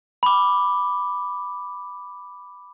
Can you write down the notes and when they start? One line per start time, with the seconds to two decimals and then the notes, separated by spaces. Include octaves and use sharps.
0.23 B5 D6